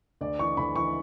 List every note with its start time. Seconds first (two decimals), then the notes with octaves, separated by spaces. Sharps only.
0.21 D2 D5
0.39 E3 C#6
0.57 D2 B5
0.75 E3 C#6